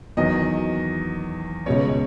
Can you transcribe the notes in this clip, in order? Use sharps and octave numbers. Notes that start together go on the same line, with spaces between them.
E2 D#3 F#3 D#5
C#2 B2 G#3 C#4 C#5